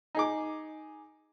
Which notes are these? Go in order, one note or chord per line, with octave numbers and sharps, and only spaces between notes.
D#4 G#4 D6